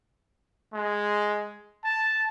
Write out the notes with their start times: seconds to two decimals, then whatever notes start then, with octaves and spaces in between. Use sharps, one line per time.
0.73 G#3
1.84 A5